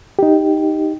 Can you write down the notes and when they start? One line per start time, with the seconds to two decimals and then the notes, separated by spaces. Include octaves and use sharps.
0.19 D#4 G4